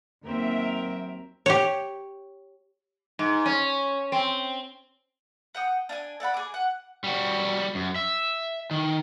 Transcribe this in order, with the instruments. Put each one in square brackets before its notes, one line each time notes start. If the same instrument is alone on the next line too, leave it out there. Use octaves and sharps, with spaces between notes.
[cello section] D#2 F#3 E5 [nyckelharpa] C4 A#4
[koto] G4 C#5
[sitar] G#2
C#4
C4
[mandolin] F#5 G5 D#6
D4 F5 G#5
A4 D5 F#5 B5
G#4 D6
F#5
[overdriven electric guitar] G3 F#4
F#2
E5
D#3